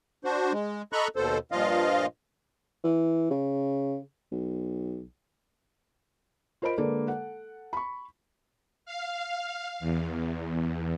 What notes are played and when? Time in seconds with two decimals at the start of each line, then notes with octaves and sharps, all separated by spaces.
0.25 D4 F#4 C5
0.53 G#3
0.93 A4 D#5 A#5 B5 C#6 F#6
1.16 D#2 B2 A4 C5
1.52 G2 A#2 F3 F4 D#5 F5
2.84 E3
3.30 C#3
4.32 B1
6.62 F4 A#4 C5 D#5 B5 D7
6.78 D3 G#3 A#3 A4 B4 D5
7.08 A4 F#5
7.73 B5 C#6
8.86 F5
9.80 E2